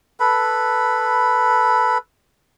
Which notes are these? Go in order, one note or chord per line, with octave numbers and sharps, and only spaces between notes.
A4 B4 B5